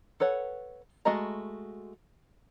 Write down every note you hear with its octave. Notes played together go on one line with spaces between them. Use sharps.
A4 B4 C#5 F#5
G#3 A3 F#4 D#5 A#5